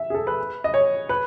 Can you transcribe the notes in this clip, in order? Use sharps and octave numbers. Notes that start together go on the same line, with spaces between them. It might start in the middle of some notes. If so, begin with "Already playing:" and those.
Already playing: E5
G#4
A4
B4
D#5
C#5
B4